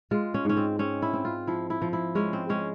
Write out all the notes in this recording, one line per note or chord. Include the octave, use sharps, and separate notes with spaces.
G#3 F4
C#4
G#2 C#4
C4
C4 C#4
E4
C4
F4
F3 E4
E4
F3
E4
G#3 C#4
C4
G#3 C#4